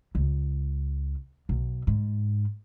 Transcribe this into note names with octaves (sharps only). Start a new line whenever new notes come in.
C#2
B1
G#2